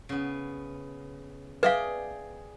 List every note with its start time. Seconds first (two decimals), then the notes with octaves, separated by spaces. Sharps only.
0.09 C#3 B3
1.63 G#4 B4 D5 E5 F5 G5